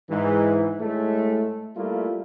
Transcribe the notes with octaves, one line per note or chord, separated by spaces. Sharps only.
G#2 E3
A2 G#3 A3
G3 A3 A#3 E4 F4